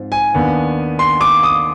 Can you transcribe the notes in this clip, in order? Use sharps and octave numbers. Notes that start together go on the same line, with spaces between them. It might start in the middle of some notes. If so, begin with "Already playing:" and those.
Already playing: G#2 F3 C4
G#5
D#2 D#3 B3 D4
C6
D6
D#6